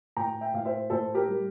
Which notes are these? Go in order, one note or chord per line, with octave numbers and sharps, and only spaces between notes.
A2 G5 A#5
E5 G5
A2 F5
C5 E5
A2 A4 C5
G4 A#4
G3